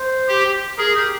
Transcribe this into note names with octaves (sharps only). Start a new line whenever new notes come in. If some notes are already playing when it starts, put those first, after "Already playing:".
Already playing: C5
G4
G#4 A#4
G4